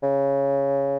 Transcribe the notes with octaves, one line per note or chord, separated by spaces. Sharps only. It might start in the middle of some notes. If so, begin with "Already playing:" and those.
C#3